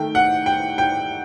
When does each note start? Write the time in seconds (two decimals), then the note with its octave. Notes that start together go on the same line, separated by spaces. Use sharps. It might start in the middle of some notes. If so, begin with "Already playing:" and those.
Already playing: D#3 A3 G5
0.15 F#5
0.46 G5
0.78 G5